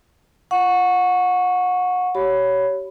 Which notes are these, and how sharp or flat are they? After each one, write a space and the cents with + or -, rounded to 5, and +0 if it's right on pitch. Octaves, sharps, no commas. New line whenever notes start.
F#5 -30 C#6 +0
G4 -40 C#5 +10 B5 +0